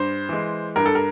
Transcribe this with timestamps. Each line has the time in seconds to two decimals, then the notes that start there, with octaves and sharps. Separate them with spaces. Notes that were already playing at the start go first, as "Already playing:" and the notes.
Already playing: G2 C5
0.29 E3 G#3
0.76 G2 A#4
0.86 A4
0.95 A#4